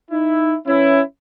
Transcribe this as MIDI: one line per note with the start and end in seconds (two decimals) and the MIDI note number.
0.11 0.55 63
0.11 0.55 64
0.66 1.00 52
0.66 1.00 61
0.66 1.00 64